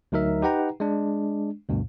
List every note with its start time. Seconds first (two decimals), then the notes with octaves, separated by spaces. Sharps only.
0.12 D2 F#3 D#4 A#4 E5
0.42 D#4 G4 B4 F#5 G5 A#5
0.80 G#3 D4
1.69 D2 G2 B2